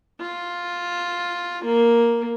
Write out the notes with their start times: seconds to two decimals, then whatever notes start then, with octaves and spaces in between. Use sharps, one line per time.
0.20 F4
1.65 A#3